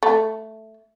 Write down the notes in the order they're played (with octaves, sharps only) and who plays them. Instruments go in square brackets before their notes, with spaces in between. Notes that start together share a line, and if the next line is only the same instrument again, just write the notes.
[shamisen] A3